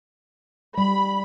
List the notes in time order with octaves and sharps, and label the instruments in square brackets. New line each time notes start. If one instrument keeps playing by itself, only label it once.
[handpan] G3 [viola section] B5